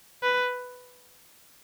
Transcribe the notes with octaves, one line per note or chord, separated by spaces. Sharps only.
B4